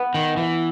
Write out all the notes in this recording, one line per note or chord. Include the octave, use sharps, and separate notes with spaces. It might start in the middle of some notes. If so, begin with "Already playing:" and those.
Already playing: B3
D#3
E3